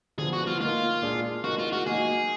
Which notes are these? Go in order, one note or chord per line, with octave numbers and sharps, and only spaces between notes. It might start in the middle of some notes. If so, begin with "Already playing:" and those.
D3 F3 B3 G#4
F#4
F4
A#3 D#4 F4 A#4
A#2 G#3 D4 G#4
G#3 D#4 F#4 A#4
F4
F#4
F#3 A#3 D#4 G#4